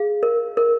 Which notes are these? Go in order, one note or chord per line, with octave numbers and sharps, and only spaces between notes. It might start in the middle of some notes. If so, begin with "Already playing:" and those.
Already playing: G#4 F5
A#4
A#4